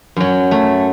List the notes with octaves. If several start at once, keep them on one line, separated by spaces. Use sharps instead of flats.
F#2 F#3
A3